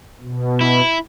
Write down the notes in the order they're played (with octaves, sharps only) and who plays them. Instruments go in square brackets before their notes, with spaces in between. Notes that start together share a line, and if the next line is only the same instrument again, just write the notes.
[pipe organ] B2
[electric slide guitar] E4